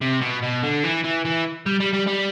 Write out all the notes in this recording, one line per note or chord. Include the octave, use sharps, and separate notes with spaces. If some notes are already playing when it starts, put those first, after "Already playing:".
C3
B2
B2
D3
E3
E3
E3
G3
G3
G3
G3